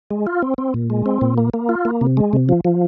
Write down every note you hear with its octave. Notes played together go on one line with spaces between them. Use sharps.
G#3
F4
C4
C4
A#2
G#3
C4
A#2
A#3
A#3
F4
A#3
C3
G#3
C3
F3
F3